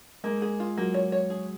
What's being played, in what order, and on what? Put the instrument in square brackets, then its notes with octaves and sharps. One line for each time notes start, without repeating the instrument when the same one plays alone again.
[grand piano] G#3 [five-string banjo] A#3
[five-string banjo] G#4
F4
[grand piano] F#3 [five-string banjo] A#3
[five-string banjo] C#5
C#5
G#4